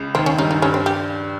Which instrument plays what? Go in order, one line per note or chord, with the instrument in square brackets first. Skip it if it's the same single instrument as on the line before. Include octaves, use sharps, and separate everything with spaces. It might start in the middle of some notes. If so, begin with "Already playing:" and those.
Already playing: [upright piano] C#2 C#3
[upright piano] D#2 D#3 [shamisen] C4
[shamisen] C#4
[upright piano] G2 G3 [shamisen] D#4
[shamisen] D#4
[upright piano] G2 G3 [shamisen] C#4
[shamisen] C4
G4